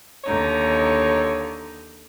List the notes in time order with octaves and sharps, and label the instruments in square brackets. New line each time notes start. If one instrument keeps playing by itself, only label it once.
[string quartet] D#2 D3 D#4 [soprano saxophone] C#5